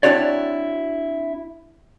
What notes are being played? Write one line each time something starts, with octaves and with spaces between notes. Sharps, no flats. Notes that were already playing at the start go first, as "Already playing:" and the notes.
C4 D4 E4 F#4 C#5 D5